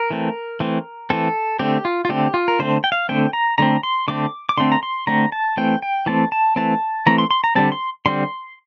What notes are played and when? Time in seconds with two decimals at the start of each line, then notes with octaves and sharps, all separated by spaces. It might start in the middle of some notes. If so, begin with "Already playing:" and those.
Already playing: A#4
0.11 E3 A3 C4
0.60 E3 A3 C4
1.10 E3 A3 C4 A4
1.59 D3 A3 C4 G4
1.85 F4
2.05 F4
2.09 D3 A3 C4 G4
2.34 F4
2.48 A#4
2.59 D3 A3 C4 C5
2.84 G5
2.92 F5
3.09 D3 A3 C4 G5
3.33 A#5
3.58 D3 A3 C4 A#5
3.83 C6
4.08 D3 A3 C4 D6
4.49 D6
4.57 D3 A3 C4 C6
4.72 A#5
4.83 C6
5.07 D3 A3 C4 A#5
5.32 A5
5.57 E3 A3 C4 G5
5.82 G5
6.06 E3 A3 C4 A5
6.32 A5
6.56 E3 A3 C4 A5
7.07 E3 A3 C4 A#5
7.18 C6
7.31 C6
7.44 A#5
7.55 D3 G3 C4 A5
7.72 C6
8.06 D3 G3 C4 C6